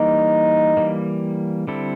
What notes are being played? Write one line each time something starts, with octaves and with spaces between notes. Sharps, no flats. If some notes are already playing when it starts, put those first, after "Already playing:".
Already playing: E3 G3 A#3 D#4
E3 G3 A#3
D3 G3 C4 E4 A4